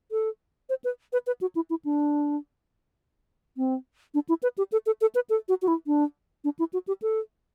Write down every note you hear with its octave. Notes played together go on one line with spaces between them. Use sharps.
A4
C5
B4
B4
B4
F#4
E4
E4
D4
C4
D4
E4
B4
G4
A4
A4
A4
B4
A4
F#4
F#4
E4
D4
D4
E4
F#4
G4
A4